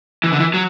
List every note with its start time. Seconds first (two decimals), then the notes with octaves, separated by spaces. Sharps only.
0.24 E3
0.32 D3
0.40 E3
0.54 F#3